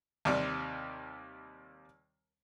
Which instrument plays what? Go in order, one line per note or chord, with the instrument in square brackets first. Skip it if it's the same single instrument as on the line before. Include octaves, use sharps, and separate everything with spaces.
[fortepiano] D#2 C3 G3 D6